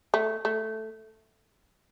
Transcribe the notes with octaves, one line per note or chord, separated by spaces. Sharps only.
A3
A3